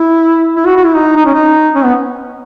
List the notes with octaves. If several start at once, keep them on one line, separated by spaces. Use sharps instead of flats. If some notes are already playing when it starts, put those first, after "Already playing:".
Already playing: E4
E4
F#4
F#4
E4
D#4
D#4
C#4
D#4
C#4
B3